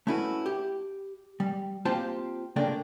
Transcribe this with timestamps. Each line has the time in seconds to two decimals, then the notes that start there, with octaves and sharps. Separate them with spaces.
0.07 A3 C#4 E4 F#4 B4
0.46 G4
1.40 G3
1.85 A#3 C4 F4 G4 C5 A5
2.56 C#2 C#3 A3 A#3 D4 G5